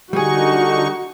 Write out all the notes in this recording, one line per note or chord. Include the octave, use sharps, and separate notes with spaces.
D3 G3 D#4 F#4 G#4 C#6